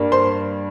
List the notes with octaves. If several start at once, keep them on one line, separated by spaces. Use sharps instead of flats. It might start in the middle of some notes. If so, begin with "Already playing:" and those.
Already playing: G2 G3 A#3
C5 C6